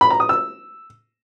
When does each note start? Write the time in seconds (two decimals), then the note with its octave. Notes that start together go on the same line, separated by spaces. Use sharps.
0.01 B5
0.10 A#5
0.20 D#6
0.29 E6